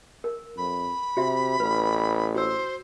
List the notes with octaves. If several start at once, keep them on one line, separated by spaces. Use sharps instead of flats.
A#4
F2 B5
C3 F#4 E5
A1 B4
F#4 C5 E6